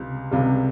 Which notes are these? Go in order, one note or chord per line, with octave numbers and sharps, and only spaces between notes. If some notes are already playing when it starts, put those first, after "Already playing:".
Already playing: C#2 C3 G3
C#2 C3 G3